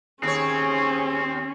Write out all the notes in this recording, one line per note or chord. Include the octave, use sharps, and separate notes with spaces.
D#2 C4 C#4 G#4 C#5